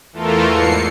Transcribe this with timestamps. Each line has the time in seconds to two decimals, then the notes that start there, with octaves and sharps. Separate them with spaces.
0.12 E2 E3 A3 F4 A4 A#4
0.47 E2 G#2 C7 C#7